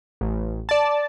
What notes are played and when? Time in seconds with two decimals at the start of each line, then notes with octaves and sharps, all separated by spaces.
0.21 A1
0.69 D5 A5